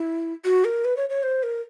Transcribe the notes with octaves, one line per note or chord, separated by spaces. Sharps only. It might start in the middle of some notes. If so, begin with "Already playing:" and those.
Already playing: E4
F#4
A#4
B4
C#5
C#5
C5
A#4